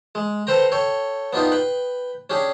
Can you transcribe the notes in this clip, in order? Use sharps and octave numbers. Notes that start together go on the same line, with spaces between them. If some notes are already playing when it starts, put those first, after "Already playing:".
G#3
A4 B4 C5 G5 A#5
A4 C#5 G5
B3 D4 D#4 F4 G4
B4 G5 B5
C#4 D4 G4 G#4